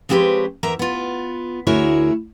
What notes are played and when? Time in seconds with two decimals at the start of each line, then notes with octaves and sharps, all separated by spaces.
0.09 F3 G#3 C4 G4 B4 C#5
0.63 E2 A#4 E5 A#5
0.79 B3 F4
1.67 D2 E4 F#4 G#4 A#4 C#5